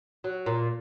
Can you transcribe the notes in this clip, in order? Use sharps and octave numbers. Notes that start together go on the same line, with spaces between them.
F#3
A#2